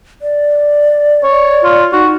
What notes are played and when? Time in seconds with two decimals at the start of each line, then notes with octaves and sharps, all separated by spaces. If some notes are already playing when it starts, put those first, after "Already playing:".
0.22 D5
1.23 C#5
1.64 F4
1.93 D#4 F#4